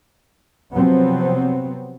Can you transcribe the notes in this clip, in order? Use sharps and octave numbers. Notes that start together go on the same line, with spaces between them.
C3 F3 F#3 B3 C4